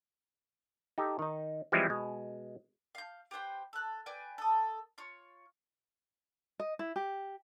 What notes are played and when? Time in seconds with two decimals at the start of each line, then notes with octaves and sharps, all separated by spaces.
0.98 D#4 G4 A4
1.19 D#3 D#4
1.72 E3 F3 G3 G#3 C4 E4
1.89 B2 G#3
2.95 F5 G6
3.31 G4 B4 C5 G5
3.73 A4 F#6
4.06 B4 D5 G5 G#5
4.38 A4 D#6
4.98 F4 C#5
6.60 D#5
6.79 E4
6.96 G4